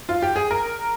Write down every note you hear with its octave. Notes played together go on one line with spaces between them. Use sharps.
F4
G4
G#4
A#4